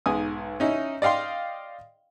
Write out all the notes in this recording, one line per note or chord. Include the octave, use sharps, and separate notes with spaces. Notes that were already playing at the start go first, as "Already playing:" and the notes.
B1 G#2 G#5 D#6
C#4 D#4 E4
D5 D#5 F5 G5 C6